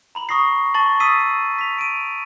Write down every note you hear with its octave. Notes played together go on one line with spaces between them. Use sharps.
A#5 B5 F#7
C#6 D#6 A#6 C7
A5 C#6 A6 F#7
D#6 E6 B6 C7 D#7
B6 F7
D7 D#7